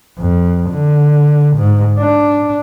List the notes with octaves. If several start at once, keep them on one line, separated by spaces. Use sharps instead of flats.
F2
D3
G#2
D4